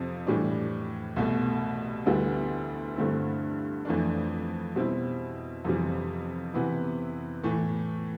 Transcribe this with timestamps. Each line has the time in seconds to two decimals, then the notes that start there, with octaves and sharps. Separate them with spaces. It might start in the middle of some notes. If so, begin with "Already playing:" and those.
Already playing: F2 C3 F3
0.27 A2 E3 G3 D4
1.16 C2 B2 A3
2.06 D2 D3 G3 B3 E4
2.96 G2 D3 A3 C4 E4
3.85 F2 E3 A3 D4
4.75 B2 G3 C4 E4
5.64 F2 C3 E3 G3
6.54 C3 E3 B3 E4
7.44 A2 E3 A3